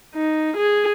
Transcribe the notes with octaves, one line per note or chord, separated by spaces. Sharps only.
D#4
G#4